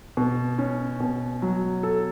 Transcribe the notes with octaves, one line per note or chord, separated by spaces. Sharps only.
B2
C#4
B2
F#3
A4